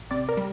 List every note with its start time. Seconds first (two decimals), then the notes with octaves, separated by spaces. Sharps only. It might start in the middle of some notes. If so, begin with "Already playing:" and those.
Already playing: A1
0.11 C3 D5
0.29 A#4
0.37 G3